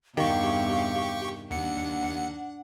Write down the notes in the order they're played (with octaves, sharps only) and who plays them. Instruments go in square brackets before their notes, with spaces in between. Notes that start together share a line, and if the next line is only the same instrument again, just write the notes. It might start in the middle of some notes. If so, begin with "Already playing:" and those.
[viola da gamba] E2 G2 C3 [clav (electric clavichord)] D#3 [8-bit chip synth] G4 C#6 [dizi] F5
[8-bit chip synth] D#2 C#7 [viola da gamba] D4 [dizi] F#5